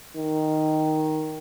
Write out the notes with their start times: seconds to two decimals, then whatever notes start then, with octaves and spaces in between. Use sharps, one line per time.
0.17 D#3